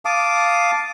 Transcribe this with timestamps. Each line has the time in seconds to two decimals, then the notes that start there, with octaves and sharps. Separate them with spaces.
0.05 F5 A5 D6 D#6